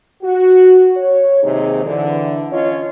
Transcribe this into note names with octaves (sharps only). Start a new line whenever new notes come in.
F#4
C#5
D#2 C3 G#3 D#4 G#4
D3 E3
C#4 F4 C#5 D#5